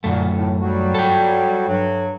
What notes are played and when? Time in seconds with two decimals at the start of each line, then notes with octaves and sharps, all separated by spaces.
0.04 F#2 A#2 D3 A3
0.35 A2
0.62 F#3 G3 F#4
0.94 A4 G5
1.68 G2 F#3